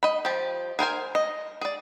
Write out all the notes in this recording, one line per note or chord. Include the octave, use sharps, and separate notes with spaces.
D#5 B5
F3 G4
G#4 A#4 C5 G#5
D#5
G#4 D5